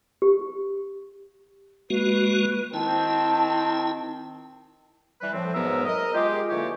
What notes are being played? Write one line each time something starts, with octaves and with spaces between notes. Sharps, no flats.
G4
G#3 A#3 F#4 B4
D#3 C4 E4 A5
E3 G3 B4
A2 F3 C4
G#2 B2 F#3 B3 A#4 E5
A#4 D#5
G#3 F4 G4
D3 E3 F#3 A#3 G4 C#5